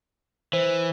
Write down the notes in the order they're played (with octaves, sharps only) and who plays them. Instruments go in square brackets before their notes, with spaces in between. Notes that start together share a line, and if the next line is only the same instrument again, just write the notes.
[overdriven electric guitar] E3 [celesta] C5